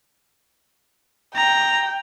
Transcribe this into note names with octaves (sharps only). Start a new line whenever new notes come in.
G5 A#5